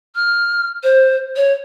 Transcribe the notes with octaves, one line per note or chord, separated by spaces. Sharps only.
F6
C5
C#5